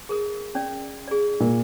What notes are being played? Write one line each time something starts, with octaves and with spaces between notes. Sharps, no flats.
G#4 A#4 D#6
C#4 D5
G#4 D5
A#2